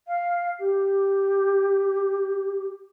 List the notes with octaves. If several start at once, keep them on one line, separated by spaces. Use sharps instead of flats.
F5
G4